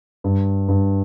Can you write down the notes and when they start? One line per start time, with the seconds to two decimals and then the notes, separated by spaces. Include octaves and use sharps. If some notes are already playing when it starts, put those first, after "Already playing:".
0.24 G2
0.68 G2